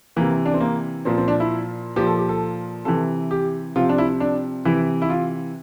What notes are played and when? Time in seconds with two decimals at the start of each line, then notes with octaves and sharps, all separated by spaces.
0.16 C3 E3 A#3
0.46 D4
0.54 C4
0.60 A#3
1.05 A#2 F3 C4
1.18 C4
1.28 D4
1.40 E4
1.96 A#2 F3 G4
2.07 A4
2.19 G4
2.29 A4
2.85 C3 E3 A4
3.31 G4
3.76 C3 F3 F4
3.89 D4
3.98 E4
4.20 D4
4.65 C3 E3 E4
5.02 E4
5.10 F4